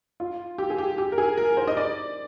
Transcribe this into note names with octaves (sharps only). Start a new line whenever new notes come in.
F4
G4
G#4
G4
G4
A#4
G#4
A#4
C5
D#5
D5